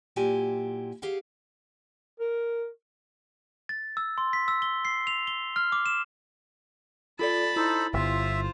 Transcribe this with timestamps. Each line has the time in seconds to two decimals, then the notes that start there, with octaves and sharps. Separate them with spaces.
0.16 A#2 F#3 E4 F4 G4 G#5
1.02 G4 G#4 F5 F#5
2.20 A#4
3.69 A6
3.97 E6
4.18 C6
4.33 B6
4.48 E6
4.62 G7
4.85 C7
5.07 F7
5.27 G7
5.56 F6
5.72 D6
5.86 E7
7.19 F4 A4 D5 A5 B5
7.56 D#4 E4 A4 C5
7.94 G1 F4 C5 E5